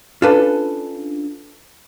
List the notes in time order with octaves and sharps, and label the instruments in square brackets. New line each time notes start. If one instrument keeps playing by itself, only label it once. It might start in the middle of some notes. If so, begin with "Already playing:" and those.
[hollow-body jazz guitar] C#4 D4 F4 [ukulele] A4 B4